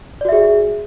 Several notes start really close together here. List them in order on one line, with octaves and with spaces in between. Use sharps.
D5 F#4 E5 G#4